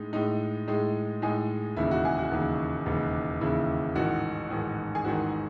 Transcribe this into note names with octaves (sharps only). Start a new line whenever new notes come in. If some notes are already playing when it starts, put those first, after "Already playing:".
Already playing: A2 G#3 D#4
A2 G#3 D#4
A2 G#3 D#4
A2 G#3 D#4 G#4
E1 D#2 C#3 E4
F#4
G#4
F#4
E1 D#2 C#3
E1 D#2 C#3
E1 D#2 C#3 E4
A1 G#2 D#3 F#4
A1 G#2 D#3
G#4
A1 G#2 D#3 F#4